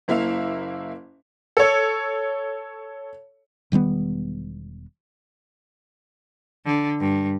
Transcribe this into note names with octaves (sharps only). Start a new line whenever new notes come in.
F#1 A#3 E4 E5 F5 F7
A4 C#5
E1 D#3 G3 B3
D3
G2